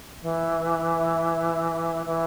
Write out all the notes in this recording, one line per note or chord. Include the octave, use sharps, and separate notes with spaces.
E3
E3